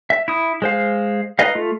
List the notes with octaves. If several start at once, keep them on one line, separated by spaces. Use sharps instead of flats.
E5
E4 D#6
G#3 C5 F5
D#4 B4 D#5 F5
A3 F4